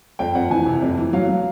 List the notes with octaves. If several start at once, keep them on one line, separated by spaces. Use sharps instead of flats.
F2 G5
F2 F#5
E3 G#5
C3
F2
E3
F#3 F5
F#3